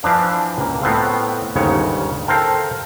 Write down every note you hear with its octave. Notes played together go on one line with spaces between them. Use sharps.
E3 F3 D4 F5
C#2 A#3
A2 B3 C4 F5
G1 D#2 G#2 C#3 C#5
A4 A#4 C5 F5 G5 A5